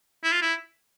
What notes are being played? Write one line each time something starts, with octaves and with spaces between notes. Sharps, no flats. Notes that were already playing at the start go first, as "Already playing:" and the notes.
E4
F4
E4